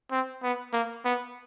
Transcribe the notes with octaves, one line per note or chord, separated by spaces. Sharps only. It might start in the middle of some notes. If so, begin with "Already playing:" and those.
C4
B3
A#3
B3